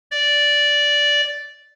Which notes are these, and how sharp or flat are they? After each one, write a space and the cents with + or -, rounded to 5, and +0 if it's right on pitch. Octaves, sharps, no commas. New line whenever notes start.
D5 -10